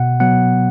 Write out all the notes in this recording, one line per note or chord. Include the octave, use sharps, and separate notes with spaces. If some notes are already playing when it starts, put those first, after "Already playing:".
Already playing: B2 F#5
F#3 B3 F#5